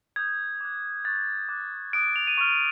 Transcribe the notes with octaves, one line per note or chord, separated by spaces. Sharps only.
D#6 G6 G#6
D6 F#6
C#6 F#6 A6
D6 F#6
D#6 F#6 D7
F7
D#7
C#6 F6 D#7